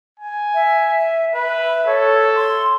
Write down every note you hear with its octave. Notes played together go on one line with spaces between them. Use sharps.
G#5
E5
B4 E5
A4 C#5
C6